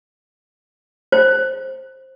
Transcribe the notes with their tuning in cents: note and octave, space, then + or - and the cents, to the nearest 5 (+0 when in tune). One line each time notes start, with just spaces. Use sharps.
C5 +10